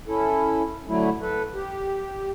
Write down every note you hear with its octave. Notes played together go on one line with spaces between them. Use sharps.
C#4 E4 A4
D3 F#3 A3 E4
A4 B4
G4